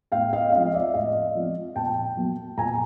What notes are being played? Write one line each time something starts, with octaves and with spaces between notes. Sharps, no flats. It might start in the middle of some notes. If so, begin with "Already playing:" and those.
A2 F5 G5
D#5 F5
F3 G#3 C4 D#5 F5
D5 E5
A2 D#5 F5
F3 G#3 C4
A#2 G5 A5
F#3 A#3
A#2 G#5 A#5